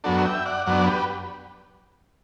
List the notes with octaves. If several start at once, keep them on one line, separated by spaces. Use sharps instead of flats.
F#2 F#3 B3 D4 F#4 A4
E5 G5
D5 F#5
F#2 F#3 B3 D4 D5 F#5
G4 B4